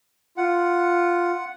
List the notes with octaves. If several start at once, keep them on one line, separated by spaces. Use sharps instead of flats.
F4 F#5